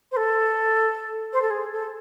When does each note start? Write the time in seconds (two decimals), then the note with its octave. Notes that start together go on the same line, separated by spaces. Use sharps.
0.11 C5
0.16 A4
1.33 C5
1.41 A4
1.50 G#4
1.72 A4